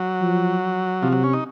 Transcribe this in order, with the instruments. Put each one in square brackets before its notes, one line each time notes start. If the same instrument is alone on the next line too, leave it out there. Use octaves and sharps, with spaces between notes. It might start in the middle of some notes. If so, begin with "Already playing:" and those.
Already playing: [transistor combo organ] F#3
[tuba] F3
[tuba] C3 [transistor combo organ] F3
[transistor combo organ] F#3
C#4
D#4